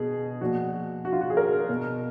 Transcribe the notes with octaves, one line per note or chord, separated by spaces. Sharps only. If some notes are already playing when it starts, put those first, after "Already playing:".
Already playing: B2 G#4
A#2 F3 F#4
F#4
F4
F#4
G#4
A#4
B2